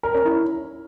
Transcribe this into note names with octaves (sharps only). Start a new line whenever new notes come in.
A#4
C#4
E4